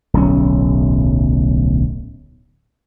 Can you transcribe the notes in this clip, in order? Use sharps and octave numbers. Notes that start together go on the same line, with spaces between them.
D1 B1 C#4